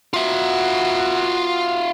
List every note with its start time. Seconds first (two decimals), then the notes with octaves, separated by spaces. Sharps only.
0.14 F#3 B3 F4 F#4 E5